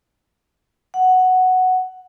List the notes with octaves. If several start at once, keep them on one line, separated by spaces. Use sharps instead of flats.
F#5